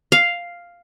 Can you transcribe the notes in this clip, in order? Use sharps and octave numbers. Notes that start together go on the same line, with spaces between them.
F5